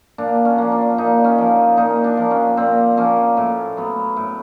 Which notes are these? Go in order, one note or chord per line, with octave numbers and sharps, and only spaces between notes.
A#2 D4
C#4
F3 A#3
D4
A#2 D#4
C#4
F3 A#3
A#2 D#4
D4
F3 A#3
C#4
A#2 C4
F3 A#3 C#4
A2
F#3 B3
A2